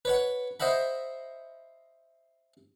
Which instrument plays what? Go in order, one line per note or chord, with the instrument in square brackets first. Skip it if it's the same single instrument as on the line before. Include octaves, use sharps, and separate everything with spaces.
[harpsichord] B4 C#5 F#5
C5 D#5 E5 F#5 B5